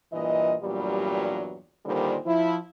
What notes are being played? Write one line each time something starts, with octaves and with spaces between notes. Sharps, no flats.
G2 A#2 E3 D#5
E2 G2 A#2 F#3 G3
D#2 A#2 D3 D#3 G3 C5
F3 E4